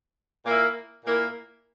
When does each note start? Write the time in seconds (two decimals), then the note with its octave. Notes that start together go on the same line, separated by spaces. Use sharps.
0.44 A#2 A#3 E4
1.04 A#2 A#3 E4